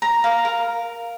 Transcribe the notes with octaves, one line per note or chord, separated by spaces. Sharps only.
A#5
F5
A#4